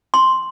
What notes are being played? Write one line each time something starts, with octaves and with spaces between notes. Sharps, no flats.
C6